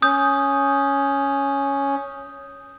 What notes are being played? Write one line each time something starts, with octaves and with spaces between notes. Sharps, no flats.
C#4 D#6 G6